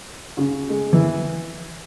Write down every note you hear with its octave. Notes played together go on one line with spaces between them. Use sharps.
C#3
G#3
E3